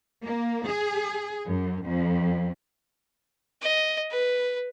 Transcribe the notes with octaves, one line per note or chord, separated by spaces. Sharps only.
A#3
G#4
F#2
F2
D#5
B4